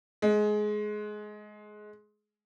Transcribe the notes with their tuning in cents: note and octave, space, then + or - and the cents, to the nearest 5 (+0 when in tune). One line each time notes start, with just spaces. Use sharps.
G#3 +15